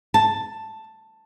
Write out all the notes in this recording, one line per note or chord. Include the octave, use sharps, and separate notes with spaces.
A5